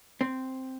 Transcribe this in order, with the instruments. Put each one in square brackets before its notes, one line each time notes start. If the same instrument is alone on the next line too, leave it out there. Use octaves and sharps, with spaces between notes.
[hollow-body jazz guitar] C4